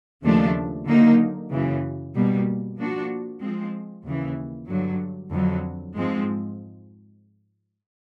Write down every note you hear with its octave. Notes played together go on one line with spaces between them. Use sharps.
D#2 C#3 F3 A3 D4
D3 F#3 A#3 D#4
F#2 C#3 E3
B2 G3 A#3
F3 A#3 D4 F#4
F3 G#3 C4
D#2 C#3 E3
G2 D3 F#3
F2 D3 F#3
G#2 F3 G#3 C4